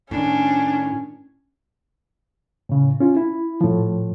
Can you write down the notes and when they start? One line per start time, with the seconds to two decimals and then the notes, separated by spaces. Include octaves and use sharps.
0.11 A2 D#3 C#4 D4
2.69 A2 C#3
3.00 C#4 F4
3.17 E4
3.61 A2 F3